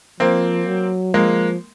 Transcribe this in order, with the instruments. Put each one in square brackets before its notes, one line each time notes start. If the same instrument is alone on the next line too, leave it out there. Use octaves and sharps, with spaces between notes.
[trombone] F3 [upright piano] A#3 C4
[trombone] F#3
[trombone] F3 [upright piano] G#3 A#3